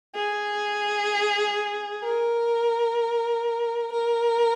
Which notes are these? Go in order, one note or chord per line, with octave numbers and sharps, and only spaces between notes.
G#4
A#4
A#4